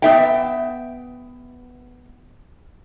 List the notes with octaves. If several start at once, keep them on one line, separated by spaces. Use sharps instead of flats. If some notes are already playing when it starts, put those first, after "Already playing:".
B3 E5 G5